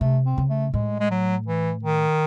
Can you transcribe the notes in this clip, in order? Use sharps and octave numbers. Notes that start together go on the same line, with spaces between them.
C3 A3
C4
C#3
A3
A2 G#3
G#3
F#3
E3
D#3